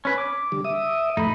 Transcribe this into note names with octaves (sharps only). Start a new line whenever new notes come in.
C#4 B4
D6
D3 G3
E5 D#6
F2 A2 A3 D#4 B5